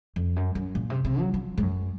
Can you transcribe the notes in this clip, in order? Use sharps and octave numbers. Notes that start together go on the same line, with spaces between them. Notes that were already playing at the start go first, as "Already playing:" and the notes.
F2
F#2
F#2
A#2
C3
C3
F#3
F3
G#2
F#2